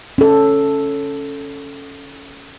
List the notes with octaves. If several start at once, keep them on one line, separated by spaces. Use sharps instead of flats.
C#4 A4